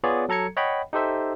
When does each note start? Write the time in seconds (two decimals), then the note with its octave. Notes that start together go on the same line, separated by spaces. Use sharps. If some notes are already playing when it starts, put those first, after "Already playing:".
0.04 B3 F4 G#4 C#5 D5
0.29 F#3 A4 A#5 G#6 C#7
0.57 C#5 D#5 F#5 G5 B5
0.93 D#4 G4 A4 C5 E5